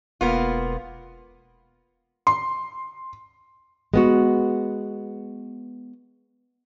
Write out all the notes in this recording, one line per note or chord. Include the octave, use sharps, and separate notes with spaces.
E1 A#3 B3 F4
C6
G#3 B3 F#4